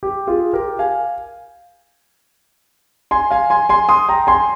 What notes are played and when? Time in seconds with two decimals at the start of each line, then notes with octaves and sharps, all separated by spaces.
0.03 G4
0.27 F4 G#4
0.53 G4 A#4
0.79 F5 G#5
3.11 G#5 C6
3.31 F5 G#5
3.50 G#5 C6
3.69 G#5 C6
3.89 C6 D#6
4.09 G5 A#5
4.27 G#5 C6